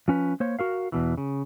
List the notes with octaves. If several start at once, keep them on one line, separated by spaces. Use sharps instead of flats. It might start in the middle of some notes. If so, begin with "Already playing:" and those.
F3 C#4 B4
A#3 C5 C#5
F#4 A#4 F5
E2 B2 E3
C#3